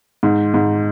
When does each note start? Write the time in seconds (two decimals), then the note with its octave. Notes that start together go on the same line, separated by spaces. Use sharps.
0.23 G#2
0.54 G#2